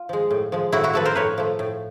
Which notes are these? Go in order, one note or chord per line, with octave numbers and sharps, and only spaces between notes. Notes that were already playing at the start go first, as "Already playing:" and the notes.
Already playing: F4
F3 G#3
A2
F3 G#3
A2 E4 F#4
E4 F#4
F3 A3 A4 B4
A#4 C5
A2 B4 C#5
F3 A3
A2